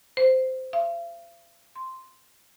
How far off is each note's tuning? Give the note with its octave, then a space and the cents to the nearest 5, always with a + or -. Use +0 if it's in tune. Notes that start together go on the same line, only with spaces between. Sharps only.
C5 -10
F5 -45
C6 -5